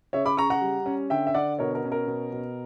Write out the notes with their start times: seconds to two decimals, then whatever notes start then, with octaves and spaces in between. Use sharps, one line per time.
0.13 C#3 C#5 E5
0.26 B5 D6
0.37 C#3 A#5 C#6
0.50 F#5 A#5
0.62 G3
0.86 C#4
1.10 D3 E5 G5
1.27 E5
1.34 D3 D5 F#5
1.59 B2 A#4 C#5
1.75 A#4
1.84 C#4
1.92 A#4
2.07 B2
2.32 B2